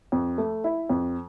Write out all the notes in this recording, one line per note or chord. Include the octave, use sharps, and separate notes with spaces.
F2
A3
E4
F2